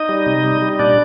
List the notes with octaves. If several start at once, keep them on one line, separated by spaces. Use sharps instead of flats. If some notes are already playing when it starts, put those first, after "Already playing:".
Already playing: D#4 D#5
G3
C3
G3
G3
A#2 D4 D5